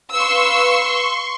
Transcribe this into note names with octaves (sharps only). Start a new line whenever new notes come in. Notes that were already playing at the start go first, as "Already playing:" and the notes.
B4 F5 C6 C#6 E6